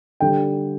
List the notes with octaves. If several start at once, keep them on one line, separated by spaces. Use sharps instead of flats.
D3 G3 G5